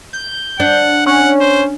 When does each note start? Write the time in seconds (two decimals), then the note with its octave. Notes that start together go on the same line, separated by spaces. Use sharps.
0.13 G6
0.60 D4 F#5
1.06 C#4 F#5
1.41 C5